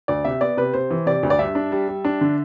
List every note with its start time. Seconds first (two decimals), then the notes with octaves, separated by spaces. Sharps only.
0.08 D2 D5
0.25 C3 E5
0.41 B3 D5
0.57 C3 B4
0.74 C3 C5
0.91 E3
1.06 C3 D5
1.23 D2
1.30 D5
1.39 G2 E5
1.55 D4
1.72 G3
1.88 G3
2.05 D4
2.21 D3